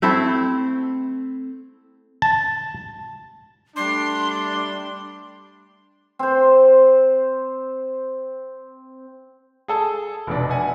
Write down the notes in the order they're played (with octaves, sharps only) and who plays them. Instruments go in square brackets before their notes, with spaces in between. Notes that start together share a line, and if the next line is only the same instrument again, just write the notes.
[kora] A3 C4 E4 A4
[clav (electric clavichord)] A5
[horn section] G3 A3 D4 [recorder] C6
[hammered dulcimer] C4 C5
[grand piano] G#4 A4 A5
F1 B2 D4
E5 F#5 G#5